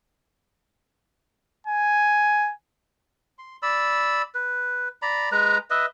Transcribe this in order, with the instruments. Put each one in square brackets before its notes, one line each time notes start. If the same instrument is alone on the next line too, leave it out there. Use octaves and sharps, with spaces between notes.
[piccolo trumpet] G#5
[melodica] C6
D5 B5 E6
B4
D5 A#5 B5
G#3 B4 A#5
B4 D#5 E5